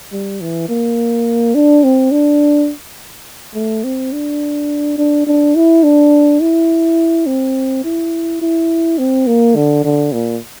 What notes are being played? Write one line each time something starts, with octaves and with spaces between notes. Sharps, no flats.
G3
E3
A#3
D4
C4
D4
A3
C4
D4
D4
D4
E4
D4
E4
C4
E4
E4
C4
A#3
D3
D3
A#2